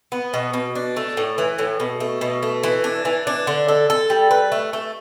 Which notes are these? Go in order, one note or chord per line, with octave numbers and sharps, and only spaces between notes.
B3
B2
B2
D4
A3
A2
E3
A2
B2
A3
B2
A3
E3
D4
E3
D4
D3
A4
A4
G3
B4
A3
A3